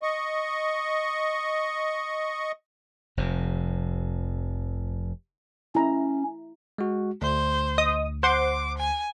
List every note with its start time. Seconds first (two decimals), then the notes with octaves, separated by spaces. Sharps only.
0.03 D#5 C#6
3.17 F1 F2 C3
5.75 C#4 E4 A#5
6.78 G#3 F#4
7.22 D2 C5
7.78 D#5 D#6
8.23 C5 F#5 C6 D6
8.78 G#5